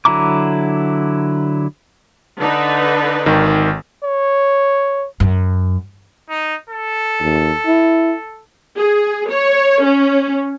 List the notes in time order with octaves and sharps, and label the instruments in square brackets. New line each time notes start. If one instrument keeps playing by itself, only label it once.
[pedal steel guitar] D3 F#3 E4 A#5 D6
[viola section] D3 D#4 B4
[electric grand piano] G#1 D#3
[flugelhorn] C#5
[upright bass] F#2
[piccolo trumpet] D#4
A4
[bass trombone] D#2
E4
[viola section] G#4
C#5
C#4